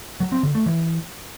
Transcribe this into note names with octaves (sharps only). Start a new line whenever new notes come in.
F#3
C4
D3
A3
E3